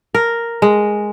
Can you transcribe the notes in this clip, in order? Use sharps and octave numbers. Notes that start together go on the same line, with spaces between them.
A#4
G#3